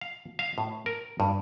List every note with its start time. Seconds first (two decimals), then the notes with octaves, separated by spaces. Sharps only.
0.01 F5
0.39 F5
0.58 A2
0.86 A#4
1.20 G2